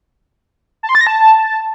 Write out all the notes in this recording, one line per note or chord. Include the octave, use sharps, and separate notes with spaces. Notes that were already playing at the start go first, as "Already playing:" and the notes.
A5
C6
A6
A#6
A5